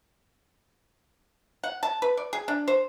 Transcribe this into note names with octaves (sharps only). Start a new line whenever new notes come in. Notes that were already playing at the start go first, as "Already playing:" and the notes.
F#5
A5
B4
D5
G#4
D4
C5